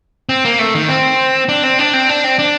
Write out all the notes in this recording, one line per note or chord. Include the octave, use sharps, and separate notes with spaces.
C4
A#3
A3
D#3
C4
D4
C4
D4
C4
D4
C4
D4